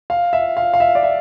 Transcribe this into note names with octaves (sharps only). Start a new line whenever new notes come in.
F5
E5
F5
F5
E5
D5
E5